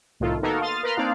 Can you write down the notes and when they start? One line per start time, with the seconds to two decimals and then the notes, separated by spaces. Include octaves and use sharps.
0.20 C2 A2 D#3 F4 A4
0.43 A#3 B3 D#4 F#4 A4 A#4
0.61 F5 C6 D#6 F6 A6
0.83 A#4 B4 A#5 C6 F6
0.97 A#3 C4 D4 D#4 D5 F5